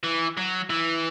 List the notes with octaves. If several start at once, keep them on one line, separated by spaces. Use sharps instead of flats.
E3
F#3
E3